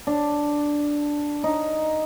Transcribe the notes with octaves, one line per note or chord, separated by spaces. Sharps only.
D4
D#4